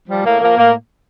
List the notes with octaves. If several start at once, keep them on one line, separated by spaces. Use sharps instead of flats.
F3 G3
A2 A#3
F3 A#3
A2 A#3